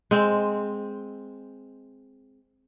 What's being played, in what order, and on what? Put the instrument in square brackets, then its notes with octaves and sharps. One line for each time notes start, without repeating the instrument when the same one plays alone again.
[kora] G#3 C4